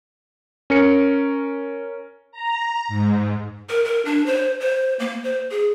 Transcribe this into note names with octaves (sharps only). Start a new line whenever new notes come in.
C#4 A#4 C#7
A#5
G#2
A#4
A#4
D4
C5
C5
A#3
C5
G#4